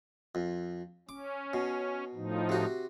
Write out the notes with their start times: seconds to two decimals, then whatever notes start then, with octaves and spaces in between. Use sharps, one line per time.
0.35 F2
1.09 C#4 D6
1.54 B2
2.15 A2 F3 D#4
2.49 C3 F#4